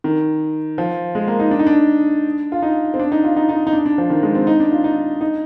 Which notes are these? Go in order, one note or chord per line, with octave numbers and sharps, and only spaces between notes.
D#3
F3
G#3
A#3
D#4
D4
D#4
D4
F4
D#4
C4
D4
D#4
F4
D#4
D#4
D#4
D4
D4
F3
D#3
G#3
C4
D#4
D4
F4
D#4
D#4